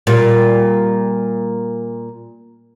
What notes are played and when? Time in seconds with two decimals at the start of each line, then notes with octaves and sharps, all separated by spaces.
0.07 A#2 G3